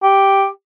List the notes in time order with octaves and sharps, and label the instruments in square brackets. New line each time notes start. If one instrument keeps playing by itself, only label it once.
[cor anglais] G4